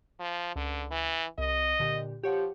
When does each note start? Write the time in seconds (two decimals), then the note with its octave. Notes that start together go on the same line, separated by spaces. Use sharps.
0.20 F3
0.56 C#2 D3
0.91 E3
1.38 C2 D#5
1.79 A#2 D3 G4
2.23 F3 G4 C#5 F#5